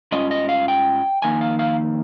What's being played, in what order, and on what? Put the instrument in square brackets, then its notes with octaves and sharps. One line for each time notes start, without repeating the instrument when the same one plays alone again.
[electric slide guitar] G#2 G3 C#4 F4 D#5
D#5
F5
G5
F2 D#3 A#3 D#4 G#5
F5
F5